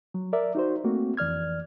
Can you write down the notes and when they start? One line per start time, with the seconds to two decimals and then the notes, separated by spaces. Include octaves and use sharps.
0.14 F#3
0.33 A#4 D5 E5
0.55 D#4 F#4 C5
0.84 A3 A#3 C4 F#4
1.17 F2 E3 D5 F6 G#6